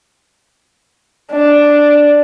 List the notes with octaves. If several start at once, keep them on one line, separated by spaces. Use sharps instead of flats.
D4